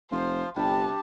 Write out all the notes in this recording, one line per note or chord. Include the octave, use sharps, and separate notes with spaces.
F1 F3 F4 C5
G1 C3 G3 D4 G4 A5